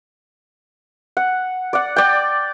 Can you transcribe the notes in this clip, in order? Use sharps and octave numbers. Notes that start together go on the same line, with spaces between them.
F#5
D5 F#5
D5 G5